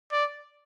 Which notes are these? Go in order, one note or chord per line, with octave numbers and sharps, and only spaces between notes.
D5